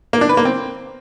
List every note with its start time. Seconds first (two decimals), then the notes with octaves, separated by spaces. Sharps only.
0.13 A#3
0.21 D4
0.29 B4
0.37 A#3
0.45 C4